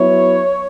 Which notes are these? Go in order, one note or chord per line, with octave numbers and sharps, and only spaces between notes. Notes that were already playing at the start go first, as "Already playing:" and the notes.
Already playing: F#3 B3 E4 C#5